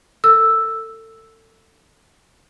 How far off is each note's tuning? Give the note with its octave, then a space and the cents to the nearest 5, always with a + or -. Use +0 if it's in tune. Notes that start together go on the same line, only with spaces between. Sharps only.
A4 +30 E6 +0